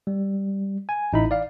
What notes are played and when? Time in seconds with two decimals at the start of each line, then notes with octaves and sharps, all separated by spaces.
0.07 G3
0.89 G#5
1.13 A1 D#4 E4 B5
1.31 D5 F5